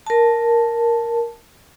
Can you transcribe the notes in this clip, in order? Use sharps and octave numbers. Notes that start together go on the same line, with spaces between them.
A#4 A5